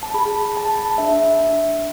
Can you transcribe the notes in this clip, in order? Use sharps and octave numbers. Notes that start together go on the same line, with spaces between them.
A5
G#4 B5
G#4 A5
D4 E5
D4